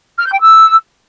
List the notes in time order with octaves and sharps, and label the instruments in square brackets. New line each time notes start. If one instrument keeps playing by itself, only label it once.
[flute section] F6
G6
G5
E6